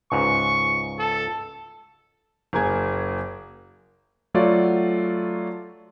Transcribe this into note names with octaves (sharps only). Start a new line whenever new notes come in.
C#2 G#2 C#6
A4
F#1 A#3 G#4 G#6
F#3 A3 F4 F#4 C#5 D5